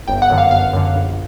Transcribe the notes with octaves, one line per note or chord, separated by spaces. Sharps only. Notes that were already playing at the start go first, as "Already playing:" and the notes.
G1 G5
F#5
F#2 D3
F5
G1 F5
F#2 D3
A#1